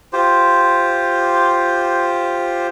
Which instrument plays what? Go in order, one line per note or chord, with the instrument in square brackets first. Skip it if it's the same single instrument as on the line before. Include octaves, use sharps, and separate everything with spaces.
[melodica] F4 G4 C5